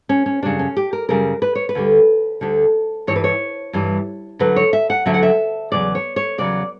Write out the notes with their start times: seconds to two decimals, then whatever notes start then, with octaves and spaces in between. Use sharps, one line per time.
0.09 C#4
0.26 C#4
0.43 F#2 C#3 G3 D4
0.59 C#4
0.76 G4
0.93 A#4
1.09 F#2 C#3 G3 A#4
1.42 B4
1.55 C#5
1.69 B4
1.75 D2 D3 G3
2.41 D2 D3 G3
3.07 G2 E3 G3 C#5
3.16 B4
3.24 C#5
3.73 G2 E3 G3
4.39 D2 D3 F#3 B4
4.56 C#5
4.73 E5
4.90 F#5
5.06 D2 D3 F#3 E5
5.14 F#5
5.23 E5
5.72 E2 C#3 F#3 D5
5.95 C#5
6.16 C#5
6.38 E2 C#3 F#3 D5